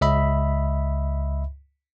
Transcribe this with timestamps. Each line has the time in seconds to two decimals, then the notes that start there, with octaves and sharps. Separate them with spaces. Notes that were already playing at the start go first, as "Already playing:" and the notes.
0.01 C#2 D#5 E5 B5